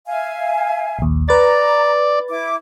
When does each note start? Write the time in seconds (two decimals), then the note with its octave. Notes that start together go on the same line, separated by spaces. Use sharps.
0.06 E5 F5 G#5
0.99 A#1 D#2
1.29 B4 D5 A#5 A6
2.29 E4 D6